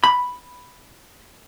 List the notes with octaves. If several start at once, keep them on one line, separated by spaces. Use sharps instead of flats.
B5